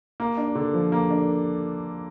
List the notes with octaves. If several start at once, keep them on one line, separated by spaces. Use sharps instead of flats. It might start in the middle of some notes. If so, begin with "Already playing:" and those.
A#3
D4
D3
F3
A#3
D4